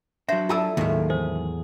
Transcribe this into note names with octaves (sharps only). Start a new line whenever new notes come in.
F#3 D4 C5 E5 B5
E4 F4 A4 D5 A5 E6
D#2 A2 D#3 F#3 G#3 E4
E2 G#4 C5